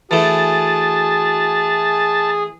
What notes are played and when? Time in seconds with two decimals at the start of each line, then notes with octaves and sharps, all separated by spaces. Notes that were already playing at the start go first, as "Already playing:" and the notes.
0.11 E3 A3 F#4 G#4 A5